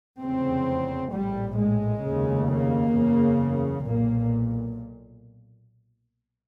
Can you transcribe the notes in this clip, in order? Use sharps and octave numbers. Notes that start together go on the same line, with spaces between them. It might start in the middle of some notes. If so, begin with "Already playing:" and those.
F1 E2 C#3 C4
A#1 A2 G3
G#3
F1 D#2 C#3
A#3
F#1 E2 C#3
B1 A#2 A#3